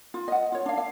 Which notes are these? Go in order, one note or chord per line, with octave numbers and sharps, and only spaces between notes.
F4
D#5 F#5
F4 C#5
D4 F5
F5